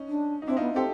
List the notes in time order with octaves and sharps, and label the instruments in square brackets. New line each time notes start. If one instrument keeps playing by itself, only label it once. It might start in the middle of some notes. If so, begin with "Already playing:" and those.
Already playing: [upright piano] C#4 D#4
[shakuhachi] D4
[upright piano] D#4
[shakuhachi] C4 [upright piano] D4 E4
[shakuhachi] B3 [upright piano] D#4 F4
[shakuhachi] C4 [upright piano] G4 A4